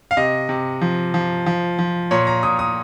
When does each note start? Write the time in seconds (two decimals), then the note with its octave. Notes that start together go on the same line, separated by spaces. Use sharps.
0.11 F5
0.17 C3 D#5
0.49 C3
0.81 F3
1.14 F3
1.46 F3
1.79 F3
2.11 A#2 C#5
2.27 A#5
2.43 A#2 D#6
2.59 D#6